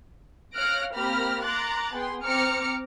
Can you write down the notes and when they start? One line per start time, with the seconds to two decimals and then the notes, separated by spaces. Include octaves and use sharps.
0.54 C#5 F5 F6 F#6 A#6 D7
0.94 A#3 C4 G4 B5 F6 A#6
1.41 A#5 C6 D6 F#6 A6
1.93 B3 G#4 G5 C6
2.24 C4 A#5 D6 F6 C#7